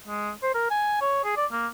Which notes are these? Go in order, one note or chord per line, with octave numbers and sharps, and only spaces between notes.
G#3
C5
A#4
G#5
C#5
G#4
D5
A#3